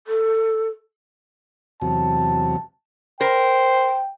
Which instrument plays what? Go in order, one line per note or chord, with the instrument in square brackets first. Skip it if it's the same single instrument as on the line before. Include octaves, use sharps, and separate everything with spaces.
[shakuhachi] A4
[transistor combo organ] E2 C3 F#3 [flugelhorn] A5
[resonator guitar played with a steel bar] A#4 [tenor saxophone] C5 [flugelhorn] G5